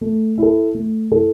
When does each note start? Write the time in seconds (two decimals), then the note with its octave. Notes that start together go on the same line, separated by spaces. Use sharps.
0.01 A3
0.38 E4 A4
0.75 A3
1.12 E4 A4